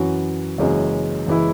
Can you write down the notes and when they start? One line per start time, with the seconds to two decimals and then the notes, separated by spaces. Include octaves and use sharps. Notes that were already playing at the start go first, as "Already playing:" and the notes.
Already playing: F#2 E3 C#4 F#4
0.58 F#1 F#2 E3 G#3 C#4
1.27 F#1 E3 G#3 E4